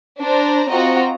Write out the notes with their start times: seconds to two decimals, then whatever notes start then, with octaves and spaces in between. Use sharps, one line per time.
0.20 D4 C5 A#5
0.71 C4 F4 F#4 D#5 A#5